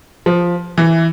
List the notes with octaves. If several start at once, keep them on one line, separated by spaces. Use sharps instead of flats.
F3
E3